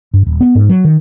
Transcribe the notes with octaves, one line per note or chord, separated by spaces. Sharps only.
G2
D#1
B3
G#2
F#3
D#3